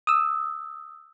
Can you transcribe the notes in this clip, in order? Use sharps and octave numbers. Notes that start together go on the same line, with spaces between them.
D#6 E6